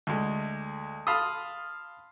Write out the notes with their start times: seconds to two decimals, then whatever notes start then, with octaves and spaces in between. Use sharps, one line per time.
0.07 D2 G#3
1.07 F5 A5 B5 C6 D#6